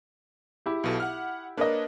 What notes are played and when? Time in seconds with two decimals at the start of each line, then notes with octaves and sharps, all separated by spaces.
0.66 E4 G4
0.84 B1 B2 A4
1.00 F#5 F6
1.57 A#3 D4 A#4 B4 C#5 D#5